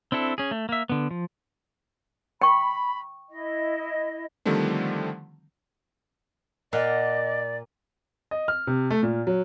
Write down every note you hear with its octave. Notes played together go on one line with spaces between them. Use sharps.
C4 D4 E4 A4
C#4 G#4
A3
A#3 E5
D3 B3
F3
G5 B5 C#6
E4 D#5
D3 D#3 F3 G3 A3 C4
A#2 D5 D#5 F5 F#5
D#5
F6
C3
A3
A#2
F#3